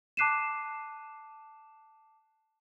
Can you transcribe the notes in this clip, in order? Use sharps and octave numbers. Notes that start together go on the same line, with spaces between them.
A5 D6 F#6 C7 D#7 E7